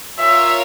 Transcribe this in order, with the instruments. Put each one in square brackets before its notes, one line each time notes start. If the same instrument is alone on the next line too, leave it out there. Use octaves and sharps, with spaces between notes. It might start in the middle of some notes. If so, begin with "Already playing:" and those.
[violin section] F4 A#4 C#5 F5 [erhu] E5